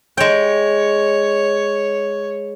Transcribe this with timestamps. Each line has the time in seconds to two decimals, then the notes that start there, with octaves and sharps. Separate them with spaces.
0.17 G#3 C#5 G5